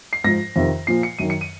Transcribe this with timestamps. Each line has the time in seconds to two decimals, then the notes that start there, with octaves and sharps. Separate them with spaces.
0.13 C7
0.24 G#2 F3 A#6
0.56 F2 C3 D#3
0.87 A#2 F3 C7
1.03 C#7
1.19 F#2 D#3 D#7
1.30 C#7
1.41 D#7